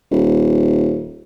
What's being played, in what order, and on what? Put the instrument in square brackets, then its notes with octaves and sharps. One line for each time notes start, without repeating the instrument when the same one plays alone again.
[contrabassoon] D#1